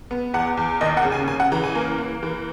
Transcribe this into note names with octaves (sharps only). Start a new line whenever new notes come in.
B3
E2 F#5
E2
D#2 D#5
F#5
C#3
G#5
C#3 G#5
F#5
E3 A#5
G#5
A#3
A#3
E3